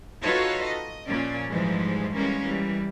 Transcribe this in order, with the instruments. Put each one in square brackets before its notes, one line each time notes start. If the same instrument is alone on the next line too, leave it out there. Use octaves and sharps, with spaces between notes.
[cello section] D#4 F4 F#4 A4 B4 C#5
D#5
A#2 F3 C#4 D5
G#2 E3 F3 G3 G#3
E3 G3 G#3 A#3 C#4
E3 G3